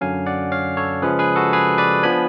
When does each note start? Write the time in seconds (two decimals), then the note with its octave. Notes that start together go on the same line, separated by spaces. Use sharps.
0.01 F#2 D3 F#3 C#4 F5 G#5
0.26 D5 F#5
0.52 C#5 F5
0.77 A4 C#5
1.02 C#3 F3 G#3 C#4 G#4 B4
1.19 G#4 B4
1.36 F#4 A4
1.53 G#4 B4
1.78 B4 D5
2.03 F3 B3 D4 G#5 B5